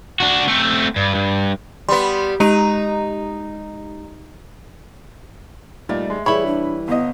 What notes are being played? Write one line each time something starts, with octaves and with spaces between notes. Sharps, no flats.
D4 F#4
A3 C4
G2
G2
G3 B3 B5 C6
G#3 D#4 G4 D#7
A#2 G3 A3 D#4
G#3
E3 G3 E4 G#4 C#5 B5
D4
G1 B3 D#5